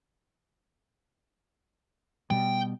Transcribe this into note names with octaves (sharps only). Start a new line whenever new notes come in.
B2 G3 G5